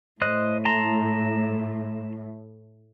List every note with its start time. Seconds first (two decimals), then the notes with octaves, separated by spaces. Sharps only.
0.22 A2 C5 D#5 F#6
0.65 A5 A#5 C6